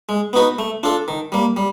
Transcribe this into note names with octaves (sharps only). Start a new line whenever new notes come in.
G#3
B3 D#4 F#4 B4
A3
D4 F4 A4
D#3
G3 A#3
G3